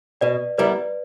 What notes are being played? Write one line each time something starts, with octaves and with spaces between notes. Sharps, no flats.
B2 B4 D5
G3 B3 E4 A#4 B4 D5